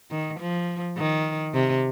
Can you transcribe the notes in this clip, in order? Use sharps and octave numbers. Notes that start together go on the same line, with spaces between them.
D#3
F3
D#3
C3